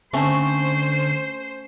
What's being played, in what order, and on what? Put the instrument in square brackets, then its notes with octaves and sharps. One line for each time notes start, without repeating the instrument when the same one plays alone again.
[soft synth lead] D3 [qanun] A3 C4 C#4 [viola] C5